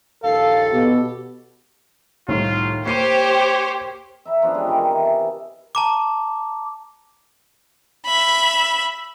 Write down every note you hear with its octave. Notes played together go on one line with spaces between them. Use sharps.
A#1 D#2 A4 F5
B2 G4
C2 A2 D#3 F4
A#3 G4 C5 C#5 C7 D#7
E5 A#5 B5
F3 B3 C#4 D4
G#3 G4 D#5
C3 D#3 A#4
E3
A5
A5 A#5 D6
E5 B5